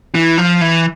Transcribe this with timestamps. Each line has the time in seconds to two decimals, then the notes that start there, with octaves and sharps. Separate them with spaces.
0.15 E3
0.38 F3
0.61 E3